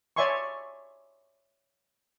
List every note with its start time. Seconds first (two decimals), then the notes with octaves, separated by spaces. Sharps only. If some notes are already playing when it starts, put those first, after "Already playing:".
0.16 C#5 D5 E5 G#5 C6 C#6